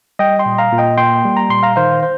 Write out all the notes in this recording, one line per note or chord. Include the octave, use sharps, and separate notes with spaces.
G3 D#5 G5
G5 C6
A#2
F5 A#5
A#2
D#5 G5
A#3 G5 C6
G3
A#5
A#2 C6
F5 A#5
D#3 C5 F5
C5